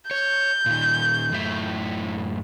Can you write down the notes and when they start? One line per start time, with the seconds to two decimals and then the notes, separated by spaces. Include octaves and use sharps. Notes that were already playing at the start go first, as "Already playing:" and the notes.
0.11 C#5 G6
0.66 A#2 D#3
1.32 F#2 A2 E4